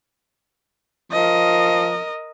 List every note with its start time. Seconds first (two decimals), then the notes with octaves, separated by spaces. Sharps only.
1.12 F3 A#4 D#5